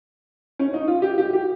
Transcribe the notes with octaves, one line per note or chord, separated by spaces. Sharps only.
C#4
D#4
F4
G4
G4
G4